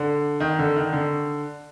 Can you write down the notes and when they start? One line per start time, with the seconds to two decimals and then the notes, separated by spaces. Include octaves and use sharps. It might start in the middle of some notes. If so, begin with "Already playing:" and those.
Already playing: D3
0.40 D#3
0.59 D3
0.76 D#3
0.93 D3